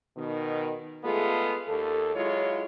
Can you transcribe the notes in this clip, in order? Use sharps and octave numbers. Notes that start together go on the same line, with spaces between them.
B2 D#3
G#3 A3 B3 F4 G#4 A4
D#2 A4
F#3 G#3 E4 F4 C#5